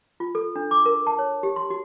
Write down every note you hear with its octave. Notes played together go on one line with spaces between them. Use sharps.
F4
A4
D4
D6
A#4
A5
C#5
G4
C6
F#4